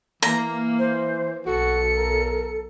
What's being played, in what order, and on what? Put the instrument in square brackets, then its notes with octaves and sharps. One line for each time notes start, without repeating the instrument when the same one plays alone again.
[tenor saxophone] E3 [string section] A#3 [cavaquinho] A#5
[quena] C5
[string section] B1 C#7 [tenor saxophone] F#4 [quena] A4
[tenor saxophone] A#4